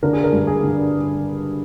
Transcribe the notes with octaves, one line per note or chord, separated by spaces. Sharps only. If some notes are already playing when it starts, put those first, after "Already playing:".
D3 A#4
G#4
A#4
G2
G#4
D3